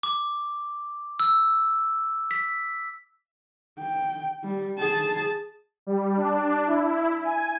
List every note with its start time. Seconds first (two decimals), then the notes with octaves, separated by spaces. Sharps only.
0.03 D6
1.20 E6
2.31 B6
3.79 G5
4.44 G3
4.78 G#4 A5
5.87 G3
6.17 D4
6.68 E4
7.24 G#5